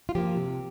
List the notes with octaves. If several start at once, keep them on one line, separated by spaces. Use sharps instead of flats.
F4
F3 A#3 G4
C3